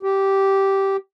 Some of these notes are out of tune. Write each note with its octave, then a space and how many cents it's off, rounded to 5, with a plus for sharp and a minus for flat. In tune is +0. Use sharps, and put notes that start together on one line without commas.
G4 -10